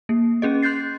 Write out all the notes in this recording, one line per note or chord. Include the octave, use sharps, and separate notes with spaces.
A#3
C#4 G#4 D#5
C6 F#6 G6 A6 C7